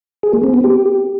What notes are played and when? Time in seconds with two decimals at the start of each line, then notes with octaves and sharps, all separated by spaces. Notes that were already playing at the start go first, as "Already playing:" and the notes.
0.23 G#4
0.33 A#3
0.44 C4
0.54 B3
0.64 G4